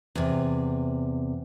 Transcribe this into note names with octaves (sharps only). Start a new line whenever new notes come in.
E2 C3